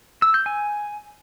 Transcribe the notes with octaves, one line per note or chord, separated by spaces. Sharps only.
E6
G6
G#5